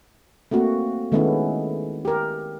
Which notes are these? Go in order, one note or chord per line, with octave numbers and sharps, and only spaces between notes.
A3 A#3 C4 F#4
D#3 G#3 A3 B3 C#4 E4
G4 A#4